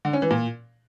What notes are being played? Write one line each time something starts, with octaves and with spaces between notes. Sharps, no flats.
D3
C#4
E3
A#2